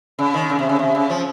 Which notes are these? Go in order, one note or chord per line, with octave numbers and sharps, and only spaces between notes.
C#3
D#3
C#3
C3
C#3
C3
C#3
F3